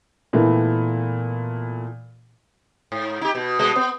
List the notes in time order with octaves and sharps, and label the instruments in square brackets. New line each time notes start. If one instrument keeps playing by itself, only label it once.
[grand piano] A#2 E3 A3 B3
[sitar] G#2
D#4 G4
B2
B2 G3 D#5
B3